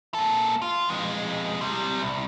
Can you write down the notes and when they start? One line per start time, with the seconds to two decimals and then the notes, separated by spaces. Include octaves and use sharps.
0.14 A#3 A4
0.62 F4
0.89 F2 G#3
1.61 C3 G3
2.02 C2